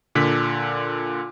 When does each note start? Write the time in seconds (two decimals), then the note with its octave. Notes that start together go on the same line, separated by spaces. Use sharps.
0.15 A#2 D3 B6